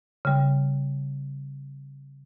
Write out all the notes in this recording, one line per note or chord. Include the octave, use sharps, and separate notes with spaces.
C#3 G3